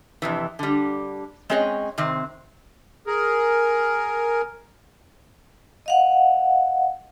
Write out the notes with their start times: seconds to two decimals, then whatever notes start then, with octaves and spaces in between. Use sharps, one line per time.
0.22 F2 C3 E3
0.59 D3 G3
1.50 G#3 C4 C#4 G#4 C#5 D#5
1.98 C3 D#3 C4
3.07 G#4 A#4
5.86 D#5 F5 F#5